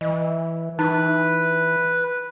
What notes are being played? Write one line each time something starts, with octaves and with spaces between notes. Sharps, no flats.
E3 D#5
E3 D#4 B4